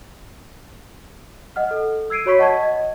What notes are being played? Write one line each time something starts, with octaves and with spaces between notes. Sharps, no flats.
D#5 F#5 F6
A4
E6 G#6 C7 D7 D#7
F#4 C#5 B5 C#6 B6
D#5 F#5 A5 C#6 G#6
D#5